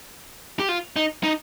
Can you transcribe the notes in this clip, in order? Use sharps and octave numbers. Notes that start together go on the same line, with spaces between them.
G4
F4
D#4
D#4